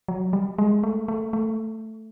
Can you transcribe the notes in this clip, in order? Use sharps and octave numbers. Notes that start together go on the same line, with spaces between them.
F#3
G3
G#3
A3
A3
A3